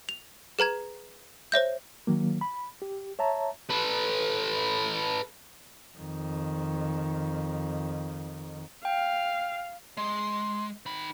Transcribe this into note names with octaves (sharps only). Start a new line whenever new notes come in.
F7
G#4 B4 A#5 G#6
C5 C#5 E5 G6
D#3 F#3 A#3
B5
G4
C#5 E5 A5 A#5
A4 B4
F2 D#3
F5 G5
G#3 C6
D#3 B5